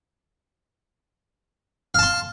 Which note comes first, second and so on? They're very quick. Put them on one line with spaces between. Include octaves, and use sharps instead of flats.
F5 A5 C6